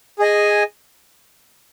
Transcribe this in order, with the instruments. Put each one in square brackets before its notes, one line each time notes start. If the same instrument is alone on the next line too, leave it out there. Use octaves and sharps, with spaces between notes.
[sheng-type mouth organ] G#4 D#5 G#5